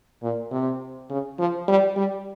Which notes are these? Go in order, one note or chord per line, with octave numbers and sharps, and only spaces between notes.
A#2
C3
C#3
F3
G3
G3